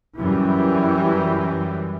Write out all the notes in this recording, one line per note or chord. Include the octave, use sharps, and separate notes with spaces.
F#2 E3 G3